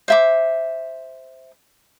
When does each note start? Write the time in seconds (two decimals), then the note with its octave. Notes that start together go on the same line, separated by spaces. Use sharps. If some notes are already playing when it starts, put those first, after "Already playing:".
0.08 C5 E5 D6